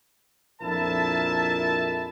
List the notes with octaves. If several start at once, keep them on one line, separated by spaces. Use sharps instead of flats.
A#1 F2 E4 A#4 E5 A5